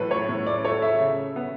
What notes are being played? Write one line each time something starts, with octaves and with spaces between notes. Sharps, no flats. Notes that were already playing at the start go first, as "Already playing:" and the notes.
Already playing: A2 F#3 A4 B4
C#5
A2
D5
A3 C#5
E5
C#3
B3